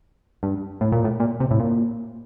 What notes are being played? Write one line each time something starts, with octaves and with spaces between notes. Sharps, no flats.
G2
A2
A#2
A2
A#2
C3
A2
A#2